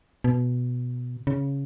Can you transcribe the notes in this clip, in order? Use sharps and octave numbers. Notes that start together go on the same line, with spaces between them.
B2
C#3